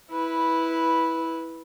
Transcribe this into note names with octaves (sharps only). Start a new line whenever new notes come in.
E4 B4